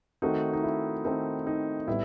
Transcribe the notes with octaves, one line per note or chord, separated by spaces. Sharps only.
D#3 A3 C4 D#4 F#4
D#4
E4
D#3 A3 C4 D#4
D#4
A2 G3 B3 E4